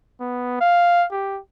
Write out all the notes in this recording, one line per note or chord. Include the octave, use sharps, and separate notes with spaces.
B3
F5
G4